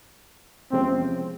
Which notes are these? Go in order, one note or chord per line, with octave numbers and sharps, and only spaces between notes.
E2 C3 F3 G#3 C4 C#4